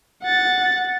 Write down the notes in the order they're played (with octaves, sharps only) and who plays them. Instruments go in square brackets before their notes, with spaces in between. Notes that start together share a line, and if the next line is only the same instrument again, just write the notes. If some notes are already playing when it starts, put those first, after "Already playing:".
[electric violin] F#5 A6